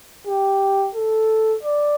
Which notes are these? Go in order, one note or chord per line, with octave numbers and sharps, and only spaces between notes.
G4
A4
D5